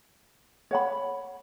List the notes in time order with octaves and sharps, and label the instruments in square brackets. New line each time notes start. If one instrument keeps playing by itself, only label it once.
[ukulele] C#5 F#5 B5